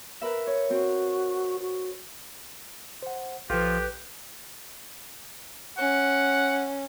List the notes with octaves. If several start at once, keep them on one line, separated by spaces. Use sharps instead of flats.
A#4 B4 E5
C#5
C4 F#4
F#4
C5 F#5
A#1 F3 F4 G4 A4 B4 G5
C#4 F#5